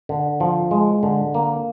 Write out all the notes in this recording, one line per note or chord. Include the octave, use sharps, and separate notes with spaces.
D3
F3
G#3
D3
A#3